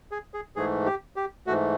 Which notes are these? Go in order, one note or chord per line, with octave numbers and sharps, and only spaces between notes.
G#4
G#4
G#2 E3 A3 G#4
G4
G4
G#2 E3 A3 F#4